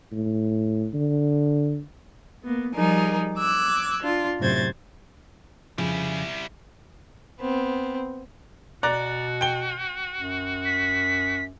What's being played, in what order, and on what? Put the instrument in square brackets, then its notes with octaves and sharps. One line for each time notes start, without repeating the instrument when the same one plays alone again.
[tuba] A2
D3
[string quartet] A#3 B3
F3 G3 D#4 G#4 A#4
D6 E6 F#6 G#6
D4 F4
F#2 A2 C3 C5 G#6 A6
[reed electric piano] F2 F3 [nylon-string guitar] C#3 [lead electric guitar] G3 E4
[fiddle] B3 C4
[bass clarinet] B2 [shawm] F#4 [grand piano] D5 A#5 F#6
[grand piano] G5 G7
[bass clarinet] F#2
[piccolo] B6